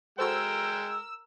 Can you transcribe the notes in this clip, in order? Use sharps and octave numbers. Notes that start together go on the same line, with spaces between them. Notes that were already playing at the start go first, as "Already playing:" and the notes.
G#3 F#4 A4 A#4 C5 G5 E6